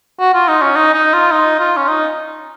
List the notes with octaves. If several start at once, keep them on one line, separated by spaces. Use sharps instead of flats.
F#4
F4
D#4
C#4
D#4
D#4
F4
D#4
F4
C#4
D#4